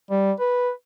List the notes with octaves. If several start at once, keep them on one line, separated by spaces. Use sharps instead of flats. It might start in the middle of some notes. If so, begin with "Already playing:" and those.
G3
B4